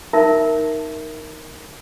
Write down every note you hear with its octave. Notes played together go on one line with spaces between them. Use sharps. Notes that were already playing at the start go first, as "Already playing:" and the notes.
D#4 A#4 E5 A5 A#5